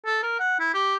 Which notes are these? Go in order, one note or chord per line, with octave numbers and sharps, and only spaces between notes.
A4
A#4
F#5
E4
G4